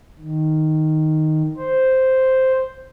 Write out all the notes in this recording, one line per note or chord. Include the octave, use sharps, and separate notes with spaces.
D#3
C5